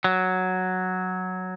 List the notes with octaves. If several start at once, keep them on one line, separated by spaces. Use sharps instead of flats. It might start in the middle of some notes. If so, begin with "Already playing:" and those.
F#3